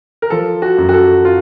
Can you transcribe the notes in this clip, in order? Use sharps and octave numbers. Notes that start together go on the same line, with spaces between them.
A#4
F3 A4
F#4
F#2
F#4
A4
F4